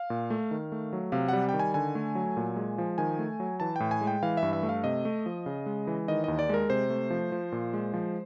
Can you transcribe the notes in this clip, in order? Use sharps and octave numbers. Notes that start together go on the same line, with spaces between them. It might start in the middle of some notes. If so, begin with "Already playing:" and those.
Already playing: F5
A#2
A3
D#3
A3
F#3
C3 F5
G3 F#5
D#3 G5
G#5
D3 G#5
A3
F#3
A#2
G#3
F3
D#3 G#5
A3
F#3
E3 A5
A2 G5
G#5
G#3
G5
E3 F5
E5
G2
E5
A3
F5
C3 D#5
A3
F3
C#3
G#3
E3
D#3 D#5
D#2 D#5
D5
G#3 A#4
C3 C5
A3
F3
F3
A#2
G#3
F3